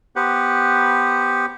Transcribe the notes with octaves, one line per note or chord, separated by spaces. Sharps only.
B3 G4 B4 C5 F#5